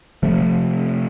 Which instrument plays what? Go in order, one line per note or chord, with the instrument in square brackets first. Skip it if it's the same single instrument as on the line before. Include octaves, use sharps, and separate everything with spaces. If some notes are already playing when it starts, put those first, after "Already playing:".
[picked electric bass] C3 F3 A3